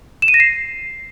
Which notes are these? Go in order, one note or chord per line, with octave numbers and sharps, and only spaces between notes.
E7
D#7
A#6
C7